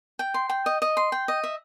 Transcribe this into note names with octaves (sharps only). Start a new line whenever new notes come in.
G5
C6
G5
D#5
D#5
C6
G5
D#5
E5